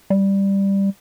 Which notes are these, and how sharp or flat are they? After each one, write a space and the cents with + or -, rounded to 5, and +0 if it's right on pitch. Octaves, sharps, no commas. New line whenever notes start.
G3 +5